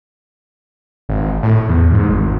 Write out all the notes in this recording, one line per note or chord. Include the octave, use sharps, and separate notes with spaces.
G#1
A2
E2
G#2
G#1